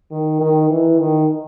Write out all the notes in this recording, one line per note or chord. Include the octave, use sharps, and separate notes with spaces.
D#3
D#3
E3
D#3